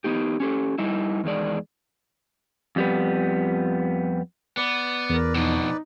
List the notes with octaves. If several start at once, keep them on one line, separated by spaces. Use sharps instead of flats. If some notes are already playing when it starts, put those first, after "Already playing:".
B3 D#4 G4
C#4 G4 A4
G3 D#4 E4
E2 D#3 G#3 D5
F2 G3 B3
B3 B4 D5
E2 A#4
F2 B2 D#4